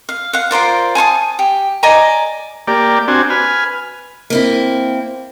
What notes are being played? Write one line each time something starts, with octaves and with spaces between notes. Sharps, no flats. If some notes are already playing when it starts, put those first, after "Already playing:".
F5
F5 F#5
F4 A#4 C5 D5
G#5 A5 C6 D#6
G4
D5 D#5 G#5 A#5
A#3 G4 D5
C4 D4 F#4 G#5
B4 G#5 F6
A#3 C4 E4